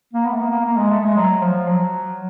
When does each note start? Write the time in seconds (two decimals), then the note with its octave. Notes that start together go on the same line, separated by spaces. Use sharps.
0.13 A#3
0.25 B3
0.33 A3
0.39 A#3
0.51 A#3
0.65 A#3
0.77 G#3
0.90 A3
1.03 G#3
1.16 F#3
1.42 F3
1.68 F#3